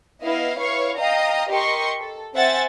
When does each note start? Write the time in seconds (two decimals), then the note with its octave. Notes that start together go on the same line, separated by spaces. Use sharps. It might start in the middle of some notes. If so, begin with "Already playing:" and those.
0.21 B3 E4 D#5 F5
0.58 E4 B4 C#5 F5 C#6
0.98 D#5 F5 G5 A#5 D#6
1.49 G4 A#4 D#5 C6 C#6
2.00 A4
2.34 C4 C5 E5 F#5 G#5 A6